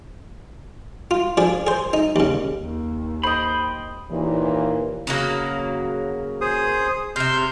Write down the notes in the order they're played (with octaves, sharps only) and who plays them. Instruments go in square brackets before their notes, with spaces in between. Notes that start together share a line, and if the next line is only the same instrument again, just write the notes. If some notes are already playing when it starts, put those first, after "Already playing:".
[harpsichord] F4
F3 D4 G#4
G#4 C5
D#4
D#2 C#3
[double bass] D#2
[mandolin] C5 D#5 [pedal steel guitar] G5 B5
[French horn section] D#2 A#2 E3
[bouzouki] C#3 F#3 A#3
[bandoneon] G#4 C5 D#6
[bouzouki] C3 E5 [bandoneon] C6 F6 G6